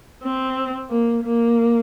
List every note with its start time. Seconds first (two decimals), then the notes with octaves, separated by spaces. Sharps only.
0.23 C4
0.90 A#3
1.24 A#3